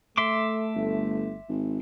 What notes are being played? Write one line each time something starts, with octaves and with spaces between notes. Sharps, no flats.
A3 E5 C6 D6
G1
G#1